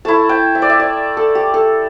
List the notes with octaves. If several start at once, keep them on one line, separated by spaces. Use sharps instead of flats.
A3 E4 A5
G5
E5
D5
E5
D5
A4
G4
A4